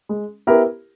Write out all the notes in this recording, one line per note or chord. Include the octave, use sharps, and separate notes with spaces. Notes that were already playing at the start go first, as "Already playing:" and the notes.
G#3
B3 E4 G4 A#4